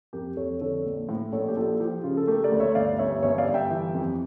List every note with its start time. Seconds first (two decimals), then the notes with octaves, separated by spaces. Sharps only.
0.13 F2 G4 A#4
0.37 F2 A4 C#5
0.61 D3 A4 C#5
0.85 A#1
1.09 A2
1.32 A#1 A4 C#5
1.48 G4
1.56 A#1 F4 A4
1.80 F3 G4
2.04 C#3 F4
2.17 A4
2.27 A3 G4 A#4
2.43 A#4 D5
2.52 D2
2.60 C#5 E5
2.75 G1 D5 F5
2.99 G1 C#5 E5
3.23 G1 C#5 E5
3.38 D5 F5
3.47 G1
3.54 E5 G5
3.70 E3
3.94 F2